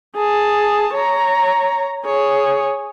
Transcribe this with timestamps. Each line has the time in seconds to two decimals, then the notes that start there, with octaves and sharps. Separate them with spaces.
0.16 G#4 A5
0.94 C#5 A#5
2.05 G#4 C#5